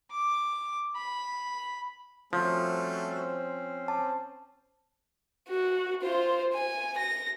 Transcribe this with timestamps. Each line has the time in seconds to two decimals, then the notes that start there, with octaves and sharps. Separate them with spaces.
0.11 D6
0.96 B5
2.33 F3 G3 A3 C4 C#4 F#4 C5
3.88 A5 D6
5.48 F#4
6.03 F4 C5
6.53 G#5
6.98 A#6